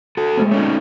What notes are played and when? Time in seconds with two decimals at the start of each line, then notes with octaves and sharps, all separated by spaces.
0.17 F#4 A4
0.37 G#3 A3 C4
0.51 A3 C#4 D#4 C#5